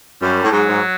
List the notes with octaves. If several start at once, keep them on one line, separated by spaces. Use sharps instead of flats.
F#2 G3
A2
G#2 F#3
G#2